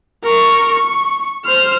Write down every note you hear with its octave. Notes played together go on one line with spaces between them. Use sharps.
A#4 C#6
C#6
C5 F6